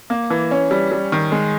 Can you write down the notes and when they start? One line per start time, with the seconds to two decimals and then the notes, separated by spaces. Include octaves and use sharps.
0.10 A#3
0.30 E3
0.51 C#4
0.71 G3
0.92 G3
1.12 D#3
1.32 G#3